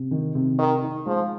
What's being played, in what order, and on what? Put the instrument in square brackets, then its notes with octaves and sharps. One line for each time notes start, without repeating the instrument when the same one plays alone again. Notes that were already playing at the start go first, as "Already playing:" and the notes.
Already playing: [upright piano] C3
D#3
C3
[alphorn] D#3 [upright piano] A#4
[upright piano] D#4
[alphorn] F3 [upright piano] G#3